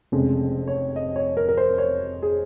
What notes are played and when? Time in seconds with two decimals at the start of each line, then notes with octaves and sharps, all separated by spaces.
0.12 F1 F2 C#3 G#3
0.68 C#5
0.96 D#5
1.16 C#5
1.37 A#4
1.49 A#4
1.57 C5
1.78 C#5
2.23 G#4